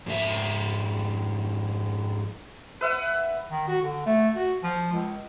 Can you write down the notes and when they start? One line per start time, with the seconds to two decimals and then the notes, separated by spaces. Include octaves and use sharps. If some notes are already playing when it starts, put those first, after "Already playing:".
0.06 F2 G#2 E5
2.81 B4 E5 F#5
3.51 D#3
3.68 F#4
3.82 D3
4.06 A3
4.35 F#4
4.63 F3
4.93 C#2